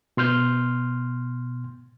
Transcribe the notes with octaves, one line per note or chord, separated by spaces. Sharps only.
B2 C6 F6 G6